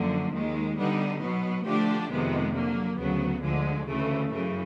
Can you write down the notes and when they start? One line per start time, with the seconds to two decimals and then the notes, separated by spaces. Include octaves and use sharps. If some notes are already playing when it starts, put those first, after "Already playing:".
Already playing: F#2 D3 F3 A#3
0.32 D#2 D#3 G#3
0.77 D3 G3 B3 D#4
1.21 B2 F#3 B3
1.65 D3 F3 A3 D4 G4
2.10 F2 C3 D#3 G#3 B3
2.53 D3 F#3 A#3
2.99 D2 C#3 F#3 B3
3.42 D2 D3 F3 G#3
3.87 D2 C#3 E3 A3
4.31 F#2 C#3 E3